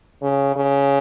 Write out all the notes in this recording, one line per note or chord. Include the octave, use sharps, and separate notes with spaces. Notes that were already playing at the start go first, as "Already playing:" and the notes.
C#3
C#3